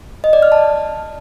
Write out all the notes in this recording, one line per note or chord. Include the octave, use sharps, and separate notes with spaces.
D#5
D5
F6
A5